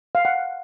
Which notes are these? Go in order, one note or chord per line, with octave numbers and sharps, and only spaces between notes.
F5
F#5